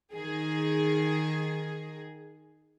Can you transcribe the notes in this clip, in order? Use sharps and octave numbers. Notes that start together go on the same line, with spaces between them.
D#3 G#4